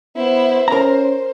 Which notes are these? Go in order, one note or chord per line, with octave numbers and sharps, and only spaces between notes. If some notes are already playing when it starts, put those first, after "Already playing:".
B3 E4 C5
C#4 A#4 C5 A#5